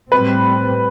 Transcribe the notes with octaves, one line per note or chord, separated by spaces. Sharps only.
A2 G3 C4 B4